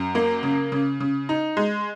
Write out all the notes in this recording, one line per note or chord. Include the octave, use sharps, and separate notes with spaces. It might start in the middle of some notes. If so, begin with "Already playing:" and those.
Already playing: F#2
A#3
C#3
C#3
C#3
D#4
G#3